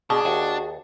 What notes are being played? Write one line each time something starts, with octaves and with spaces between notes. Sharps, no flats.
B2 D4 G#4
D#2 F#4